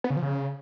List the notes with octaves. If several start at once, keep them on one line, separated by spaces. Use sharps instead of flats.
B3
C#3
F3
C#3